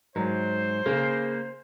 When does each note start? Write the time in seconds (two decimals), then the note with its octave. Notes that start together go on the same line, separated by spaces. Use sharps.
0.16 G#2 F#3 C5
0.86 C#3 A#3